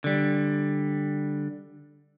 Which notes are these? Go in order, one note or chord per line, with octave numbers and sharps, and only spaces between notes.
D3 G3